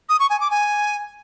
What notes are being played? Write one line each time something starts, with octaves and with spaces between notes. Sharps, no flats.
D#6
C#6
G#5
D6
G#5